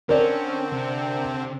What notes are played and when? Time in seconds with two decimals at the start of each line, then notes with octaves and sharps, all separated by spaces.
0.09 D3 C4 C#4 A#4 D5
0.73 C3